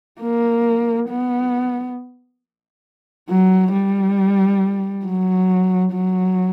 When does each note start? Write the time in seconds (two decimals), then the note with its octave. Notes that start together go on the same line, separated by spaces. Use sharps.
0.20 A#3
1.09 B3
3.29 F#3
3.73 G3
5.05 F#3
5.93 F#3